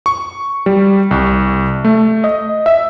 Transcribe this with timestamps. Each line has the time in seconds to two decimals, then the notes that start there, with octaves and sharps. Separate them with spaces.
0.06 C#6
0.66 G3
1.11 C2
1.85 A3
2.24 D#5
2.66 E5